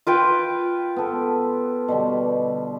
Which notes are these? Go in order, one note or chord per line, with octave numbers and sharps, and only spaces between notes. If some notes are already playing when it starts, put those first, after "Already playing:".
F4 B4 G5
B3 A4
B2 D3 G3